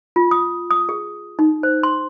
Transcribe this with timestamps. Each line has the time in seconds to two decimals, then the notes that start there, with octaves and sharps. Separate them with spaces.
0.16 F4
0.31 D#6
0.71 D#6
0.89 G#4
1.39 D#4
1.63 C5
1.83 C6